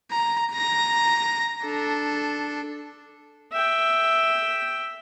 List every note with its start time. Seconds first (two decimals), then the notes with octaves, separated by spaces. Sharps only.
0.11 A#5
0.53 A#5 A#6
1.64 D4 A4
3.52 E5 G5